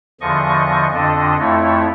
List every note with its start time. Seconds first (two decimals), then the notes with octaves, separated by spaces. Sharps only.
0.21 E2 D3 F3 D#5 C#6
0.93 F2 D3 D4 A4 D#5
1.39 F2 A3 E4 C#5